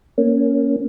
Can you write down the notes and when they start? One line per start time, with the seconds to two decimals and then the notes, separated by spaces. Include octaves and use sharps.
0.18 A#3 C#4